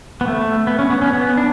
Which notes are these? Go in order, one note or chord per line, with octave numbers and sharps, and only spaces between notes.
B3
A3
B3
C#4
B3
C#4
B3
D4